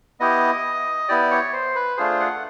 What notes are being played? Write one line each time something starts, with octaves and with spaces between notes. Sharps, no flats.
B3 E4 G4 D#5
B3 E4 G4 D5
C#5
C5
B4
A3 D4 F4 G#4 C5
F#5